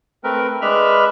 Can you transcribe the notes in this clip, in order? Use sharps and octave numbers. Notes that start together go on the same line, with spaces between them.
A3 C4 A#4 B4
G#3 D4 B4 E5 B5 F6